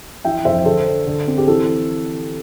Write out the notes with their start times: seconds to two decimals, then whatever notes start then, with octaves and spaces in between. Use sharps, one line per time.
0.24 E3 E5 G5
0.45 F2 C5 E5
0.65 D3 A4 C5
0.86 D4
1.07 D3
1.27 C4
1.38 G4
1.47 E3 A4